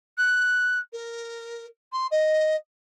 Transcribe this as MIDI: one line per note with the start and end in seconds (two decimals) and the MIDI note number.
0.18 0.79 90
0.93 1.66 70
1.92 2.07 84
2.11 2.56 75